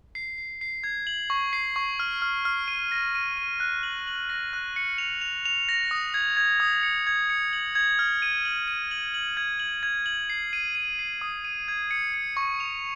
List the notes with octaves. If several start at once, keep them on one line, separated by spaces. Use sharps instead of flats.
C7
C7
C7
G#6
F#7
C#6
C7
C#6
F6
F6
F6
D#7
A#6
D#7
D#7
F#6
F#7
F#7
A#6
F#6
C#7
F7
F7
F7
A#6
D#6
G#6
G#6
D#6
C#7
G#6
C#7
F#7
G#6
F6
D#7
F#7
D#7
F#7
F#7
G#6
F#7
G#6
F#7
C7
D#7
D#7
C7
D#6
D#7
G#6
C#7
C#7
C#6
F7